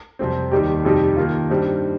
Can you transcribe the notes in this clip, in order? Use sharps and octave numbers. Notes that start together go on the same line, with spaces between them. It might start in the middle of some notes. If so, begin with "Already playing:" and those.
F2 C3 G3 C4
D#2 D#3 G3 D#4 G4
F2 C3 G3 D#4 G4
D#3 A#3 F4
G2 G3 C4 D#4